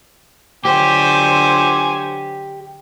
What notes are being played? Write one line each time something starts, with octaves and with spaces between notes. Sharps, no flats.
D3 F#3 G4 C5 G#5 D6